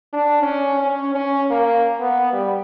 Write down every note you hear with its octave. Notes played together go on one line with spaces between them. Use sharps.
D4
C#4
C#4
C#4
A#3
B3
G3